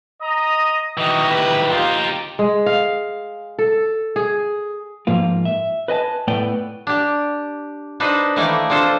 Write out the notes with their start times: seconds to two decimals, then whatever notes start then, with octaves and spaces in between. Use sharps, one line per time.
0.22 D#5 A#5 D#6
0.98 D#3 E3 D#4 F#4 D#5
1.30 E4 G4 B4
1.69 D#4 F4 G4
2.39 G#3
2.66 F5
3.59 A4
4.16 G#4
5.07 G#2 F3 A#3 F4
5.45 E5
5.88 B4 D#5 G#5 A5
6.28 A2 A3 B3 D5 G5
6.87 D4 G4
8.00 D4 D#4 B4 C5
8.36 D#3 E3 A3 A#3 D#4 D5
8.70 C4 D4 F4 A4 C5